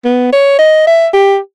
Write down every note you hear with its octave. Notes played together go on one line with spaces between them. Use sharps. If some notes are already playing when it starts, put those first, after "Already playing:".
B3
C#5
D#5
E5
G4